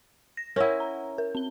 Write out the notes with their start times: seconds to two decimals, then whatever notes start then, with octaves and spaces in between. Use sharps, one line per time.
0.37 A#6
0.56 C#4 E4 A#4 C#5 F#5
0.80 A#5
1.18 A#4
1.35 C4 G7